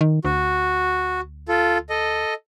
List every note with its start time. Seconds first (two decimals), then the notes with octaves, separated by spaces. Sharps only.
0.01 D#3
0.25 D2 F#4
1.48 F4 A4
1.90 A4 D#5